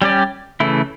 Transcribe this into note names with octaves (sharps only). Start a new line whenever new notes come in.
G3 C#4 G4 D5
C#3 E3 A3 E4